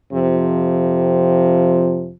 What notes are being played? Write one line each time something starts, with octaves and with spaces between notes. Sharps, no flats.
F2 C3 F3